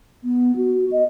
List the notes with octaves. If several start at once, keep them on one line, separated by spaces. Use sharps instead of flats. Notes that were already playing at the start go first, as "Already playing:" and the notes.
B3
F#4
D#5